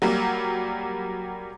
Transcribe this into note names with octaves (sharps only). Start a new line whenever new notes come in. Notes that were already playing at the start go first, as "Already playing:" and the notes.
F#3 G3 A#3